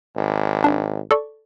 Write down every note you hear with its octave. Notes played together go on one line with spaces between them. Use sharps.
G#1
D4
A4 D5 C#6